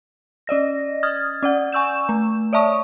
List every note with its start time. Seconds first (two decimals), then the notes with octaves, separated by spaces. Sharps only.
0.47 C#4 D5 D#5 A#6
1.03 D#6 F6 G#6 A6
1.43 C#4 D5 F#5
1.72 G#5 C#6 E6 G6 E7
2.09 A3
2.53 C#5 D5 E5 A5 C#6 D#6